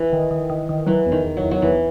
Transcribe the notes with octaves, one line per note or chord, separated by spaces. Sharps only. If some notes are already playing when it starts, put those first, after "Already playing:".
Already playing: E3
D#3
D#3
D#3
D#3
E3 F#3
E2
D#3
E2
F#3
E2
F#3
E2 E3